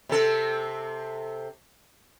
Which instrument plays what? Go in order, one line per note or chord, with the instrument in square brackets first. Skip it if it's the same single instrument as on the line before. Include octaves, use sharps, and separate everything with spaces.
[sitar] C3 C4 A4